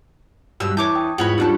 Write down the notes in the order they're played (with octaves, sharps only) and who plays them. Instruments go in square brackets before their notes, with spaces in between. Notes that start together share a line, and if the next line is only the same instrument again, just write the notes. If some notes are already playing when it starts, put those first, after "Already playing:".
[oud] G2 B2 G3 [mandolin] E6
[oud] E2 [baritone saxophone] E3 [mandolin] C#5 D6 G6 [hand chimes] A5
[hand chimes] G5 D#6
[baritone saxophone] E2 [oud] G#2 [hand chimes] F4 [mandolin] F#4 C#5 B5
[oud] G3 D4 A4 [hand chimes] D#4 F4